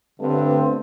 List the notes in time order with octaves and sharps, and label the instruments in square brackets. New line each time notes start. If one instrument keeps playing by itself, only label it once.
[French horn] G2 [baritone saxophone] D3 [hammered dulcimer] A3 B3 C#5 [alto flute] C4